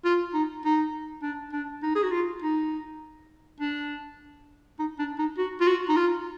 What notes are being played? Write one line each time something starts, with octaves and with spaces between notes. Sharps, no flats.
F4
D#4
D#4
D4
D4
D#4
G#4
F#4
F4
D#4
D4
D#4
D4
D#4
F#4
F4
F#4
D#4
F4